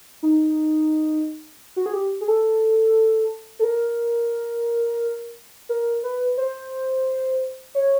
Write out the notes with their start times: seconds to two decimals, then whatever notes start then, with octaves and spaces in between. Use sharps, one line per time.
0.23 D#4
1.76 F#4
1.86 G#4
1.93 G4
2.21 G#4
2.28 A4
3.59 A4
3.64 A#4
5.69 A#4
6.03 B4
6.37 C5
7.75 C#5